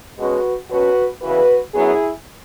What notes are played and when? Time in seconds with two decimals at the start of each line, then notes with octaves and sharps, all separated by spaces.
0.19 B2 G#3 C#4 F#4 B4
0.70 B2 F#3 C#4 F#4 B4
1.22 E2 C#3 E3 F#4 B4
1.73 F#2 F#3 B3 E4 G#4